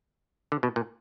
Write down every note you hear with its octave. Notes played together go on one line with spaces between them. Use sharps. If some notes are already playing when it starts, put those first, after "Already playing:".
D3
B2
A#2